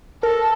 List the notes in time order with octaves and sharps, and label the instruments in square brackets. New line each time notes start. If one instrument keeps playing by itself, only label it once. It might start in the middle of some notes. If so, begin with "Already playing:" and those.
[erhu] A4 [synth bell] A#4